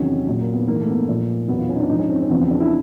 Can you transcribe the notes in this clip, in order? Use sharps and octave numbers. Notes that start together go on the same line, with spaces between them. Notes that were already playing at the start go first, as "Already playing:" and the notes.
Already playing: E2 C3 D#3 F#3 C#4
A#2 F#3
A#3
B3
G#2 E3 A#3
A3
B3
A#3
A#2 F3
E2 B2 F#3 B3
F4
C#4
D#4
D4
G#2 F3 D#4
C#4
C4
C4
E2 C#3 F3 B3
C4
D4
E4